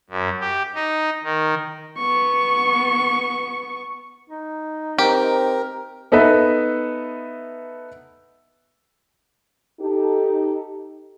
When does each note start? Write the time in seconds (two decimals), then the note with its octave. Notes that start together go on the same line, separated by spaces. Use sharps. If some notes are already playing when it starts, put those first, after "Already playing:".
0.10 F#2
0.41 G4
0.75 D#4
1.24 D#3
1.98 B3 C#6
4.30 D#4
4.98 C4 G4 A#4
6.12 B3 D#4 A4 B4 E5
9.80 D#4 G4 A4